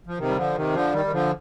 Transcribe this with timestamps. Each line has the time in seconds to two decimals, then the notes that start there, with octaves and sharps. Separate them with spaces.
0.07 F3
0.17 C3 D#3
0.28 G3
0.36 D3 F3
0.55 C3 D#3
0.73 D3 F3
0.92 D#3 G3
1.05 D#3
1.12 D3 F3